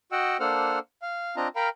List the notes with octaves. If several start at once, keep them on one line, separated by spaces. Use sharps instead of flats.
F#4 D#5 F#5 G5 E6
A#3 D4 A4 C5 F#5 F6
F5
C4 D4 F4 D#5 A#5
A#4 F5 G5 A#5 B5